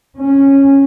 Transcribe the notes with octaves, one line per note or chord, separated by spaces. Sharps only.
C#4